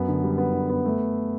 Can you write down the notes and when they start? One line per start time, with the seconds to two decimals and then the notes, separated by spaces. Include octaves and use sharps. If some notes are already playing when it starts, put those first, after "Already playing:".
Already playing: F#2 B3
0.08 D3
0.24 G3
0.38 B3
0.53 D3
0.70 B3
0.86 A3